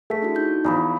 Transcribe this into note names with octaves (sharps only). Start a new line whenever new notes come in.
A3 G#4 B6
D4 E4 F#4
D#4 G6
E2 F3 A#5 B5 D6